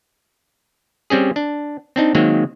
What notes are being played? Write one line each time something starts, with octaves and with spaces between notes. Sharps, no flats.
G3 C4 C#4 G#4
D4
C4 D4 D#4
D#3 F#3 G#3 A#3 C4